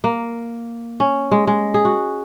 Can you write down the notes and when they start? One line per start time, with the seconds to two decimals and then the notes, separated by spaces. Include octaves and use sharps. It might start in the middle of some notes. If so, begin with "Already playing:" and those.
0.04 A#3
1.00 C#4
1.31 G#3
1.47 G#3
1.74 G#4
1.85 F#4